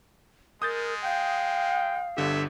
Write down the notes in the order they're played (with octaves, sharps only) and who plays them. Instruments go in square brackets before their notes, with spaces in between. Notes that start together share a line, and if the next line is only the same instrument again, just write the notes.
[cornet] G#3 [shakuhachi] A#4 [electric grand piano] D#6 G6 A6
[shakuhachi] F5 [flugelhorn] G5
[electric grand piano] G1 D3 G4 [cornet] E5